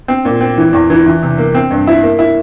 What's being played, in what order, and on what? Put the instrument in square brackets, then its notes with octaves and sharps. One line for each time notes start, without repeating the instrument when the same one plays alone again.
[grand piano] C4
A#2
C4
E3
E2
E3
E3
C3
A#3
C4
G2
E4
A#3
E4